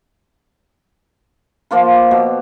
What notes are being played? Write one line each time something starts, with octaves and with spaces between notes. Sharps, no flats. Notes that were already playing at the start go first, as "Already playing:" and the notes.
F3 A#3 F4 C6
B2